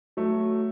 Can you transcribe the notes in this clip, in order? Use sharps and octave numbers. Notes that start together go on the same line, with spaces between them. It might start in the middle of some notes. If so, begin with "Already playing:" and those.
F#3 A3